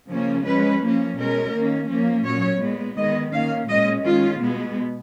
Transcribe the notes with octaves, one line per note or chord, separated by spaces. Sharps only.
C#3 F3 A#3 C#4
F3 G#3 C#4 B4
F3 A#3 C#4
B2 G#3 C#4 A#4
D#3 A#3 C#4
F3 A#3 C#4
A#2 F#3 C#4 C#5
A#2 G#3 B3
D#3 G#3 B3 D#5
D#3 A#3 C#4 F5
A#2 G#3 C#4 D#5
D#3 G#3 C#4 F4
B2 G#3 B3